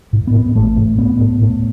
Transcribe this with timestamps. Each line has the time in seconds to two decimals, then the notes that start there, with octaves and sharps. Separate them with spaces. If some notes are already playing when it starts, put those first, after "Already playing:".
0.13 A2
0.27 B3
0.34 A2
0.55 A1 A3
0.77 A2
0.98 A2 B3
1.20 A2
1.42 A2